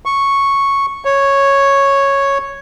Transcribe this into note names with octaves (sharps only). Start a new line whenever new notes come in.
C#6
C#5